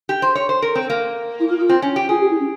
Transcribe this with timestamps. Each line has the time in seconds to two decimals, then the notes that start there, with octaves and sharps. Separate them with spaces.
0.09 G4
0.22 C5
0.35 C#5
0.49 C5
0.62 A#4
0.75 C4
0.90 A#3
1.39 E4
1.49 F4
1.59 F4
1.69 C4
1.82 C#4
1.96 G4
2.09 F4 G#4
2.20 G4
2.29 E4
2.40 C#4